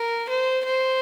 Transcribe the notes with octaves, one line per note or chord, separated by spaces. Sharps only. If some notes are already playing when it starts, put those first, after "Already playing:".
Already playing: A#4
C5
C5